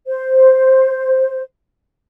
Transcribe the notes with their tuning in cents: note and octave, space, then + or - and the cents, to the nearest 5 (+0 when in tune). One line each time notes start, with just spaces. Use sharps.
C5 +0